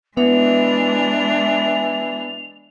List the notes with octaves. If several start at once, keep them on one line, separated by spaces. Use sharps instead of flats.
E3 G#3 B3 D4 F7